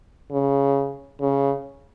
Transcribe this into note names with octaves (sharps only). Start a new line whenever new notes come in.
C#3
C#3